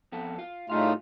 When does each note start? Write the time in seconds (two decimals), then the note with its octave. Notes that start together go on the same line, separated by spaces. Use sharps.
0.12 F2 B3 A4
0.39 F4
0.70 A2 G3 A3 D#4 F4 G#4 F5